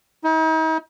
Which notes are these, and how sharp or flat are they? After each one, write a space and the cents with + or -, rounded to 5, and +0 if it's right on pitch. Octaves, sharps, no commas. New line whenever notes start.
D#4 +45